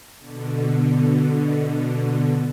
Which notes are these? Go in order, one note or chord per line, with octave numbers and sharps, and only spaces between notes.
B2 D3